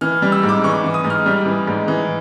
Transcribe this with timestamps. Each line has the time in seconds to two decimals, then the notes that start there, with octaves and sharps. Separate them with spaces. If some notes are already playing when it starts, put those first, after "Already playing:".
0.01 E3 F6
0.22 G3
0.32 E6
0.43 G#2
0.49 D6
0.64 E3 C#6
0.84 E3
0.94 D#6
1.04 G#2
1.10 F6
1.26 G3
1.46 E3
1.67 G#2
1.88 E3